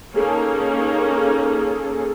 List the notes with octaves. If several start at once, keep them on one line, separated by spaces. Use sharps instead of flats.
A#3 C#4 D#4 G#4 A4